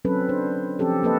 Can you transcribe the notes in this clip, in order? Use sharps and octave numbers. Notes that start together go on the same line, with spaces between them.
F#3 C4 C#4 A4 B4
D4 C5
F3 C4 C#4 G4 A4
F3 A#3 A4 B4 D#5